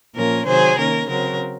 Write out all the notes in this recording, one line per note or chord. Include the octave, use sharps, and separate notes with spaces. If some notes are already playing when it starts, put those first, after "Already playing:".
A#2 F3 A#3 C#4 A#4
C3 D#3 F#3 G#4 C5
D#3 A#3 C#4 A#4
C#3 F#3 C4 A#4